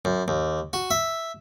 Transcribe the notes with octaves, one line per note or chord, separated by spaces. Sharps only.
F#2
D#2
F#4
E5